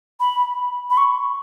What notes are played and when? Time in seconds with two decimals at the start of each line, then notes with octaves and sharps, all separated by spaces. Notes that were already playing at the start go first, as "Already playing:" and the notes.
0.20 B5
0.90 B5
0.97 C#6